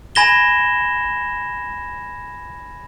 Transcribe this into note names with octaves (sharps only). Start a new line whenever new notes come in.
G#5 B5 G#6 A#6 E7 G7